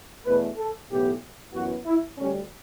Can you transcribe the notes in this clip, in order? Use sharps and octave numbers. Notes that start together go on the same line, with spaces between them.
E2 B2 A3 B4
A4
B1 A2 E3 B3 G4
F#2 E3 B3 F#4
E4
D2 D3 G3 C#4